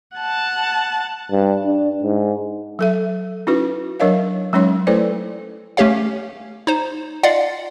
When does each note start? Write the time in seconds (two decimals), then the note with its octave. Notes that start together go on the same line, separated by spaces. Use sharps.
0.17 F#5 A5
1.32 G2
1.65 D4
2.03 G#2
2.79 F#3 A4 E5
3.47 C#4 D#4 E4 F#4 B4
4.00 F#3 D4 A#4 C#5 D#5 F5
4.53 F#3 G#3 C#4 D#4 C#5 C6
4.87 A3 E4 A4 B4 C5 D5
5.77 A3 C#4 G4 C#5 F5
6.67 D#4 C5
7.23 F4 D5 D#5 F5 F#5